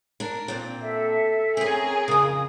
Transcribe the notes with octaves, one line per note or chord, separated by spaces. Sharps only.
D4 A#4
A#2 C4
A4 E5
C4 C#4 G#4 A#4
F2 C#3 D#6